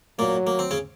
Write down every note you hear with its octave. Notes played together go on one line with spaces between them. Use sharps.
A#2 F#3 A#3
A#3
C4
C#3 C#4